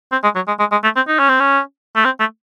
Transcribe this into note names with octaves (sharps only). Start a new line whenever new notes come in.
C4
G#3
F#3
G#3
G#3
G#3
A3
C4
D#4
C#4
C4
C#4
A3
C4
A3